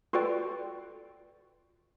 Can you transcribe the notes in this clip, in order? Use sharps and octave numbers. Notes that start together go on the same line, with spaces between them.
F4 F#4 A4 B4 D5 G5